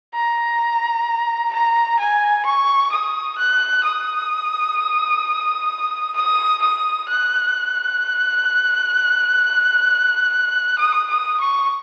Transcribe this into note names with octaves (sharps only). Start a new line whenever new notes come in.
A#5
A#5
G#5
C#6
D#6
F#6
D#6
D#6
D#6
F#6
D#6
D#6
C#6